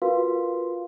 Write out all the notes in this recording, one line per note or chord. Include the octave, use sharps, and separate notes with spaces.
F4 F#4 A#4 B4 F5 C6